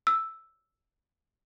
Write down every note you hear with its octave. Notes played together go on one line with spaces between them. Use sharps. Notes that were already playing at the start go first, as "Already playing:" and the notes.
E6